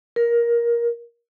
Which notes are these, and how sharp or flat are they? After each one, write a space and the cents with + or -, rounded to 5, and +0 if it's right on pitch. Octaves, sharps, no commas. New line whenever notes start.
A#4 +15